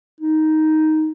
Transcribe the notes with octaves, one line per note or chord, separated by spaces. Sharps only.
D#4